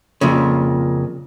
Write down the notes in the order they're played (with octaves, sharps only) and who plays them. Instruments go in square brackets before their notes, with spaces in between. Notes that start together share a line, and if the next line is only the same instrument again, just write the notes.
[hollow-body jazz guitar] F2 A#2 C#3